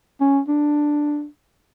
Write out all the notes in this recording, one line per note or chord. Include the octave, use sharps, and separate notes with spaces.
C#4
D4